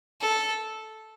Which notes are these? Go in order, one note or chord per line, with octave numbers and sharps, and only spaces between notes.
A4